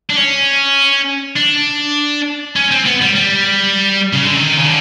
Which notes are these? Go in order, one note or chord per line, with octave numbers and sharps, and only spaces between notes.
D4
C#4
D4
C#4
C4
B3
G3
G3
C#3
D3
D#3
C#3
D3